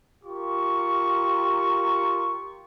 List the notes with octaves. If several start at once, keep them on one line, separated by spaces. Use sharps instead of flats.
F4 G4 A#4 C#6